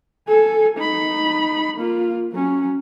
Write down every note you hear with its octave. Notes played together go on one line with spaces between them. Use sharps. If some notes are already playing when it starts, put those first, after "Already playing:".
A4 G#5
D#4 B5
A#3 F4
F#3 C#4